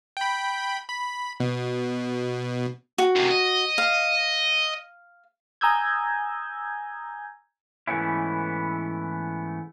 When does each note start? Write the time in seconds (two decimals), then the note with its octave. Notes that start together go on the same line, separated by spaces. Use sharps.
0.17 G5 B5
0.89 B5
1.40 B2
2.98 F#4
3.16 F#2 C3
3.31 D#5
3.78 F5
5.61 G#5 A#5 D#6 E6 G6 G#6
7.87 G#2 E3 A3 B3 C#4 E4